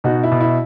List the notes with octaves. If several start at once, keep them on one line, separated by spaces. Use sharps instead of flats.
B2 D#4 F#4
E4
B2
E4